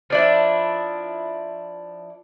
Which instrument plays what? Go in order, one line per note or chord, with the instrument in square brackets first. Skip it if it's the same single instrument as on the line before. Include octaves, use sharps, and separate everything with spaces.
[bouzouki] F3 D4 E4